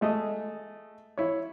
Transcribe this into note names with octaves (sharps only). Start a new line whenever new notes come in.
G#3 A3 D#5 D#6
E4 C#5